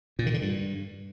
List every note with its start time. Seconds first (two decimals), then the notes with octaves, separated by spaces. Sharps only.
0.19 A#2
0.26 D#3
0.34 D3
0.42 G2